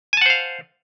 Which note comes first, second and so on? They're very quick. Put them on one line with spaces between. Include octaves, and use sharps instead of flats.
G#5 A5 F#5 C5 F5